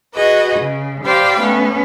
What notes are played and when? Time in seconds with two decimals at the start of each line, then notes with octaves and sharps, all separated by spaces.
0.14 F#4 G#4 B4 D#5
0.61 C#3
1.05 G4 C5 D5 F5 G5 B5
1.41 A3 B3 C#4